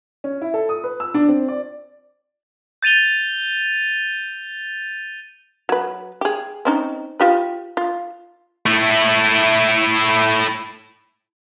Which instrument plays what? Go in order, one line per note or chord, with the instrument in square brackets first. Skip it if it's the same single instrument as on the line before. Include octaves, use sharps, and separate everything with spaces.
[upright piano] C#4
E4
A4
D#6
B4
E6
D4
C4
D5
[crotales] G6 A6 D#7 F7 G7
[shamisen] F#3 B4
G4 G#4
C4 C#4 D#4
F4 G4 B4
F4
[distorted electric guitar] A3 E4